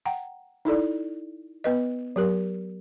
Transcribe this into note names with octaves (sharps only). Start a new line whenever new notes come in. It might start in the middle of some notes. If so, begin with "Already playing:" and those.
F#5 G5 A#5
D#4 E4 A4 D5
B3 B4 D#5
F#3 G4 A#4